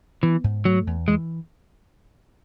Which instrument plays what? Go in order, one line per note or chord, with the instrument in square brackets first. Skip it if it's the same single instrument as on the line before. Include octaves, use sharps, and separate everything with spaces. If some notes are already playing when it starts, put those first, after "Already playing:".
[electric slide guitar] E3 [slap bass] B3
[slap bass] G#2
[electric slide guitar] F#3 [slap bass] A3
[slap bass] E2
[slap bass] E3 [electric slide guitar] G#3